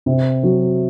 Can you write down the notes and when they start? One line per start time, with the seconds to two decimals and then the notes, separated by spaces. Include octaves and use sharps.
0.06 C3
0.43 F#3